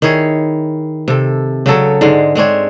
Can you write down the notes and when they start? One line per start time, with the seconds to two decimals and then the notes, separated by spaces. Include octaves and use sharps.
0.02 D#3 E4 G#4 C#5
1.08 C3 A4
1.66 C#3 F#3 A4 C#5
2.01 G#2 D3 G#3
2.35 G#3 C4 D4 C#5